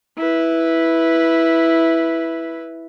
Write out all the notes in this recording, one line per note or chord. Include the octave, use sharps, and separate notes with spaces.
E4 B4